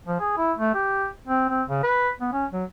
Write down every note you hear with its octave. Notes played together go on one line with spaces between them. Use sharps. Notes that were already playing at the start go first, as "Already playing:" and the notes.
F3
G#4
E4
A3
G4
C4
C4
C#3
B4
B3
C#4
F#3